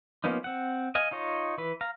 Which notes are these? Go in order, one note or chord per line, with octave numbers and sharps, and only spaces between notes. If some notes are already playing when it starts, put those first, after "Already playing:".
F3 A#3 B3 C#4 D#4
C4 F#5
D#5 F5 G#5
D#4 F4 C#5 D#5
E3 B4
F5 A#5